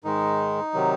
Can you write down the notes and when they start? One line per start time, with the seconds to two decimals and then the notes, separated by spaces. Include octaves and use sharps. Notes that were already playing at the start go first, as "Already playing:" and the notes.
0.04 G#2 D#3 G#3 D#4
0.74 C3 D#3 F#3